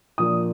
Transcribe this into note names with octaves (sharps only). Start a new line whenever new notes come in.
A#2 F3 A#3 D4 F4 D#6